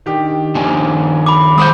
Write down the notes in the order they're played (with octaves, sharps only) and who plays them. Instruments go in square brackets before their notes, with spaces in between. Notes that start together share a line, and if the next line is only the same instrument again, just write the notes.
[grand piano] D#3 D4 G4
[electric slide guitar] D#3 F3 A#3 [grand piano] D4 G#5
[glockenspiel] B5 D6
[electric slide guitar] G#3 C5 F#5 [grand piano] D#6 G6